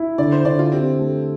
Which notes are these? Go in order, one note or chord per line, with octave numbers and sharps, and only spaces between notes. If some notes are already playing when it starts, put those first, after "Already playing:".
Already playing: E4
D3 D5
C5
D3 D5
F4
C4 G4
A3